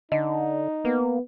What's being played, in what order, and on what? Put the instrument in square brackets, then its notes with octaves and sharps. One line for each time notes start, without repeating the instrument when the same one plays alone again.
[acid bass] D3 [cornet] D#4 [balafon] D#5
[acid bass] A#3 [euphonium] B3